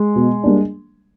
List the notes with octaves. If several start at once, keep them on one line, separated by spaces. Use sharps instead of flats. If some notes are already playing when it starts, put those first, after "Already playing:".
Already playing: G#3
B2
G3 A#3 D4